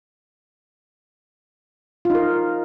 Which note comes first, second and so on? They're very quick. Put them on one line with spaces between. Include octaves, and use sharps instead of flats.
F4 D#4 A#4